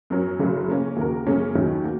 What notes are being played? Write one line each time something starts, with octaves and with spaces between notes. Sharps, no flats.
F#2 F#3 C#4 A#4
F#1 F#2 C#3 F#3
C#3 A#3 C#4
D#2 C#3 A#3 F#4 A#4
F#2 C#3 A#3 C#4
D#2 D#3 F#3 C#4
A#3 F#4